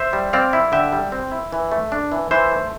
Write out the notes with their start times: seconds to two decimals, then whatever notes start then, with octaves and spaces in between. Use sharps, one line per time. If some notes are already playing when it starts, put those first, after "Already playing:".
Already playing: C5 E5
0.13 G3
0.33 C4 D5 F5
0.53 E4
0.72 D3 E5 G5
0.93 G3
1.12 C4
1.31 E4
1.52 E3
1.71 A3
1.92 D4
2.12 E3
2.31 E3 C5 E5
2.52 A3